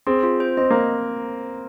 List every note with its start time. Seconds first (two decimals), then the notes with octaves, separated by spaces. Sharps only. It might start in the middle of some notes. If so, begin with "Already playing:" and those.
0.07 C4 G#4
0.23 F4
0.40 C5
0.57 C4 D#5
0.71 A#3